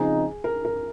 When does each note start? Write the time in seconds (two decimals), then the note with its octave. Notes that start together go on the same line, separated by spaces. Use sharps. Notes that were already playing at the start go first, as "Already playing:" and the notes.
Already playing: C#3 F3 C4 D#4 G#4
0.44 A#4
0.65 A#4